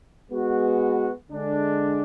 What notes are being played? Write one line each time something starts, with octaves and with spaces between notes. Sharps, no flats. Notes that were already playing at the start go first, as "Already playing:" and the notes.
G#3 B3 F#4
D3 G#3 D4